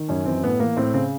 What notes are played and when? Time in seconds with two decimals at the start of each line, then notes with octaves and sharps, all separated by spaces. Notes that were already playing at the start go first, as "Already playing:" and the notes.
Already playing: D#3
0.08 F#2 C#4
0.25 E3 C4
0.43 A2 B3
0.60 E3 A#3
0.77 A2 C4
0.94 C#3 C4